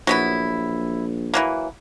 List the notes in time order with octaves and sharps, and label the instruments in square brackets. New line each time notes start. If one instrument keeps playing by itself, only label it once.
[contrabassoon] A#1 [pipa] F#3 B3 E4
[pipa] E3 F#3 A#3